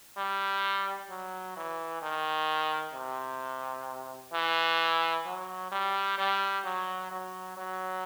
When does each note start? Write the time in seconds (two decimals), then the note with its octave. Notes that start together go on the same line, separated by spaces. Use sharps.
0.17 G3
1.10 F#3
1.56 E3
2.02 D#3
2.94 C3
4.33 E3
5.26 F#3
5.72 G3
6.18 G3
6.65 F#3
7.11 F#3
7.57 F#3